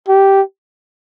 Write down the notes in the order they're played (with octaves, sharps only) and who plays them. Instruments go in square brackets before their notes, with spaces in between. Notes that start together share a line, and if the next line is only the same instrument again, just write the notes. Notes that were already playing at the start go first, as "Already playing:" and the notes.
[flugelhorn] G4